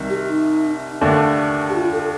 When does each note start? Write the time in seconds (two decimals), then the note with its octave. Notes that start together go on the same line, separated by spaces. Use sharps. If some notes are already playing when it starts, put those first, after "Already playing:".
Already playing: C2 C3 D#3
0.10 G4
0.27 D#4
1.01 D#2 D3 A3 D4
1.70 G4
1.75 F4
1.93 A4